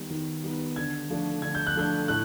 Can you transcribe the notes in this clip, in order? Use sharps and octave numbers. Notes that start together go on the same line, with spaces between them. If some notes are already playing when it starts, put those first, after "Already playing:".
Already playing: D#3 G3 B3 D#4
D#3
G3 B3 D#4
D3 G#6
F3 A3 D4
D3 G#6
G6
F#6
F3 A3 D4 G6
A2 F#6